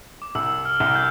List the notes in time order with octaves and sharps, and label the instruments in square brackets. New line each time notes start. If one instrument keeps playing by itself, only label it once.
[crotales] D6
[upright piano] C2 [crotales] E6
[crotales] F6
[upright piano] C2
[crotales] G6